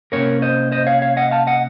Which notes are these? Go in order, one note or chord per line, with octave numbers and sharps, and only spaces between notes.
C3 D#3 A#3 C#4 A#4 C#5
C5 D#5
C5 D#5
C#5 F5
C#5 F5
D#5 F#5
F5 A5
D#5 F#5